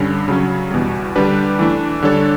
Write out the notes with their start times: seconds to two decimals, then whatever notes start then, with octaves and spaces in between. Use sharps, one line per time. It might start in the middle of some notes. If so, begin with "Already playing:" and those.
Already playing: G2 D3 G3 C#4
0.28 C#3 F#3 C#4
0.71 E2 B2 G3
1.16 D3 G3 D4 G4 B4
1.59 E3 A3 D4
2.02 D3 G3 D4 A4 C#5